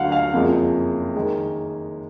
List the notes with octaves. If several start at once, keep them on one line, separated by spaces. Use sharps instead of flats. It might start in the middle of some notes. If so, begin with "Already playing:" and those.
Already playing: D2 D3 F#3 F5 F#5
F5
F#1 F2 F3 G#3
D#3 G#3